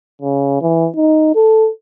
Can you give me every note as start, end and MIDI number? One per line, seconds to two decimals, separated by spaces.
0.22 0.58 49
0.62 0.88 52
0.96 1.31 63
1.35 1.69 69